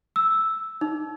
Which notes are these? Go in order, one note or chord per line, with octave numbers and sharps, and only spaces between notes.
E6
D#4